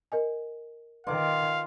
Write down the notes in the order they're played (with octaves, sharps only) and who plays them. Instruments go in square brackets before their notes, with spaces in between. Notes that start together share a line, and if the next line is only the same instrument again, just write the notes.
[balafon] A#4 D#5 G#5
[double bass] D#3 [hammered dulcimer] F4 D6 [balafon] B4 [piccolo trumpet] F5